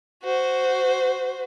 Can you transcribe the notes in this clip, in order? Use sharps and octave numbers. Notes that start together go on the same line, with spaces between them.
F#4 C5